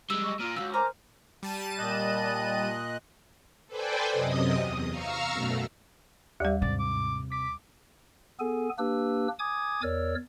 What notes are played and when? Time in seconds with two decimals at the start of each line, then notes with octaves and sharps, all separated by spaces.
0.10 G3 G#3 E6
0.24 D#5 C#6
0.40 A#2 F4 A#5 F6
0.56 C#2 F#2 F#4 F5 E6 F#6
0.73 A#4 C5 G#5 A#5 D6 F6
1.43 G3 A5 D#7
1.79 A#2 D#5 F#6
3.67 A4 B4 C5 D5 G5 G#5
4.13 F#2 C3 D#5 D#6
4.60 E2
4.88 F5 A#5 C#6 E6 F6
5.32 F#2 B2 A3
6.40 D#2 G3 G4 D5 E5
6.62 G#2 C3 D5
6.79 D6
7.32 D6 B6
8.40 B3 G#4 A4 G#5
8.79 A#3 D4 G4 B4 E6
9.39 G#5 D6 D#6 G#6
9.83 E2 A#4 C#5 D5 E6